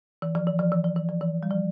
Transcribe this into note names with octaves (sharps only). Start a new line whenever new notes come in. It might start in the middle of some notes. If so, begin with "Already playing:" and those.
E3
F3
E3
F3
E3
F3
E3
F3
E3
G3
F3